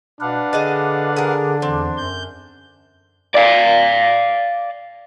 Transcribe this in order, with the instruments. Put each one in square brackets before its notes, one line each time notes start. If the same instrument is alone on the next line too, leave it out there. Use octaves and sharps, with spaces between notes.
[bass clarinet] B2 [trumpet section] D4 [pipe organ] B4 F5 F#5
[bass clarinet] D3 [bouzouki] G#4 D#5 A5
[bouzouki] G#4 A#4
[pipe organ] E2 [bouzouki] C4
[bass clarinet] F#2 [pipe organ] G6
[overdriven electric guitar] D5 F5